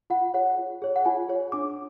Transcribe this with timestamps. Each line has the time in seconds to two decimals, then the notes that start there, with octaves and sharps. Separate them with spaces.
0.10 F4 F#5
0.34 G#4 C#5 F#5
0.58 F4
0.82 G#4 C#5
0.96 F#5
1.05 F4 G#5
1.28 G#4 C#5
1.52 D4 D6